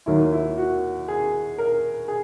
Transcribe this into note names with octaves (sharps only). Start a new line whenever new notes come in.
D#2 D#3 F#3 A#3 E4
E4
F#4
G#4
A#4
G#4